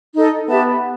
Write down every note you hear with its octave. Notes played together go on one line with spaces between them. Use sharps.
D#4 A4 D#5
B3 G4 B4 E5 A5